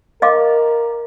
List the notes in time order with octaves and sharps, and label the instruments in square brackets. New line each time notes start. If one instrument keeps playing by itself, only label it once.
[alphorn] A#4 [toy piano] D#5 F5 D6